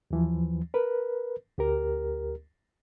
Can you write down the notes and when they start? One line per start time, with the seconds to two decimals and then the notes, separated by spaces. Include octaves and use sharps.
0.11 D#2 E3 F3
0.74 A#4 B4
1.58 D2 G4 A#4